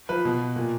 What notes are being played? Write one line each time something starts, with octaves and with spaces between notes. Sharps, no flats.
F3 B4
B2
A#2